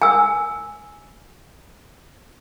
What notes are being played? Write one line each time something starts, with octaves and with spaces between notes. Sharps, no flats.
G#5 E6